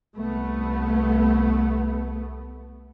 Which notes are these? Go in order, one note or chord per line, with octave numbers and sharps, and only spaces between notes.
C2 A3 B3